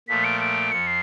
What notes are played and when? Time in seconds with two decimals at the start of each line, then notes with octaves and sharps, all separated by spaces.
0.08 A#2 F3 A3 B6
0.24 D7
0.41 D7
0.72 F2 F3 C#7
0.87 C7